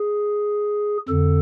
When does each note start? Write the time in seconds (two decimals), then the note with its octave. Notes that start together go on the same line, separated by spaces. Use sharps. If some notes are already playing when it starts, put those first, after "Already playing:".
Already playing: G#4
1.09 F2 D3 A4